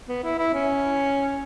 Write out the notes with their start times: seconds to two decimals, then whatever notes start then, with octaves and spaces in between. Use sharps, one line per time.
0.09 B3
0.24 E4
0.38 E4
0.53 C#4